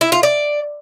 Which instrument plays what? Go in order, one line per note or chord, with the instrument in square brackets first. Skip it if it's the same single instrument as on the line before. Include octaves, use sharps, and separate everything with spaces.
[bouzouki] E4
F4
D5